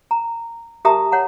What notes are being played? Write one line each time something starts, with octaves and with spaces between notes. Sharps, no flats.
A#5
G4 A#4 E5 A5 A#5 D#6
C#5 F#5 A#5